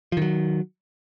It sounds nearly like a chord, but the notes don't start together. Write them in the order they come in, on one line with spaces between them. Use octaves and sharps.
F3 D#3 F#3